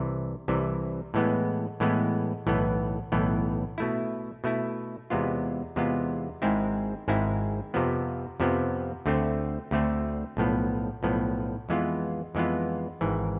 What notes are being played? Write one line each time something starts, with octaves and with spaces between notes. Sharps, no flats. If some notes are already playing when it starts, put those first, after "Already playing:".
Already playing: C2 C3 E3
C2 C3 E3
A2 E3 G#3 B3
A2 E3 G#3 B3
B1 A2 E3 B3
B1 A2 E3 B3
B2 A3 E4
B2 A3 E4
E2 C3 G#3 B3 F4
E2 C3 G#3 B3 F4
G#1 G#2 G#3 C4 E4
G#1 G#2 G#3 C4 E4
F2 C3 F3 B3
F2 C3 F3 B3
D2 D3 A3 C4
D2 D3 A3 C4
B1 A2 F3 B3
B1 A2 F3 B3
F2 E3 G#3 B3 F4
F2 E3 G#3 B3 F4
G#1 G#2 E3